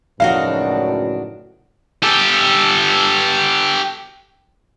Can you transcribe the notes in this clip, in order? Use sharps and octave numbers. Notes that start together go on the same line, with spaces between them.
C#2 F#2 A2 F3 D4 D#4 F#4 F5
G4 A4